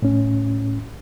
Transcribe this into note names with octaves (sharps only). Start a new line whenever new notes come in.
A2 C#4